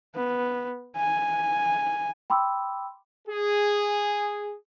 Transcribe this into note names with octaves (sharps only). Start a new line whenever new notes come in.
B3
G#5
G5 B5 C6 D6 E6
G#4